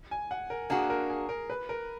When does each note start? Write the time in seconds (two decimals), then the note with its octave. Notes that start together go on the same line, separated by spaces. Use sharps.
0.11 G#5
0.31 F#5
0.50 A#4
0.70 A#3 D4 F#4 G#4
0.90 A#4
1.10 G#4
1.29 A#4
1.50 B4
1.69 A#4